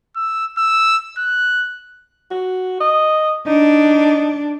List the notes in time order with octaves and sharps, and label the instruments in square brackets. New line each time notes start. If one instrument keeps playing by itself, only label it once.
[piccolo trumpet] E6
E6
F#6
[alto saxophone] F#4
D#5
[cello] D4 [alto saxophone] D#4